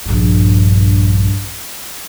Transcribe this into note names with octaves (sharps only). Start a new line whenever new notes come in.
A#1 G2